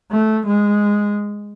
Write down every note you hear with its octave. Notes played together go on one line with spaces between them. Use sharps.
A3
G#3